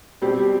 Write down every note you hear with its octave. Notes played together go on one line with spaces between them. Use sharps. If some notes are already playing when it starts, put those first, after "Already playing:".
B2 G3 C4 G4